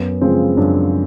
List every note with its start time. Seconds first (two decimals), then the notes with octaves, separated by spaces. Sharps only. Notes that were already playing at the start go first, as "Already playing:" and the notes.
Already playing: F#2 B3
0.21 C#3 F3 G#3 C4
0.57 F#2 D4